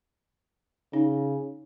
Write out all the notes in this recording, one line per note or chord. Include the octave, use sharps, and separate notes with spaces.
C#3 D#4